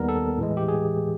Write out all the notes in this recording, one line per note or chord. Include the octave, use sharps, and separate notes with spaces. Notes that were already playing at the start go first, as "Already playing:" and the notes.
Already playing: D#2 D#3 G3 B3 A#4
A4
A2 E3 G#3
G4
G#4